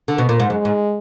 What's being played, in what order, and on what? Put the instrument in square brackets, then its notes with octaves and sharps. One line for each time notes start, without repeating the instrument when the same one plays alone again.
[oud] D3
B2
A#2
G#2
[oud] F#2 [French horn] G#3
[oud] G#2